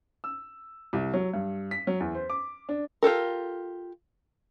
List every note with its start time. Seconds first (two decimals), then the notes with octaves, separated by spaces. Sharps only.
0.24 E6
0.93 C2
1.13 F#3
1.34 G2
1.71 B6
1.87 F#3
2.00 E2
2.15 C5
2.30 D6
2.69 D4
3.03 F4 G4 A4 A#4